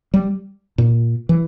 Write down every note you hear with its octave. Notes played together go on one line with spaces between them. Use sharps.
G3
A#2
E3